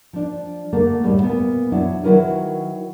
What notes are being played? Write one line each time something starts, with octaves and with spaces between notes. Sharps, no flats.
F3 D4
D3 A3 A#3
D2 A2 G3
A#2 B3
F#3 D4 E4 F#4
D#3 F#3 E4 F#4 A#4 B4